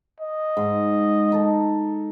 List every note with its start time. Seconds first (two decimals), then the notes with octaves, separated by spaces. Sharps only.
0.20 D#5
0.57 G#2
1.32 D#4 A4